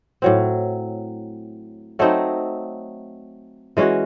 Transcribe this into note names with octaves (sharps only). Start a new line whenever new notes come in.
A2 F#3 C4
F#3 A3 C4 D#4
E3 G#3 C#4 F#4